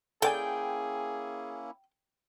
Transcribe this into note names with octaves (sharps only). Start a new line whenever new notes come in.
A#3 C#4 E4 G#4 A4 D5 G5 G#5